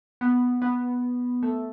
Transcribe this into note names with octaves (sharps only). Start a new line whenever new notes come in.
B3
B3
A3